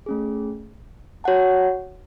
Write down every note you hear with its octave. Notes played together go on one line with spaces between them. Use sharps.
A3 C#4 G#4
F#4 C#5 F#5 A5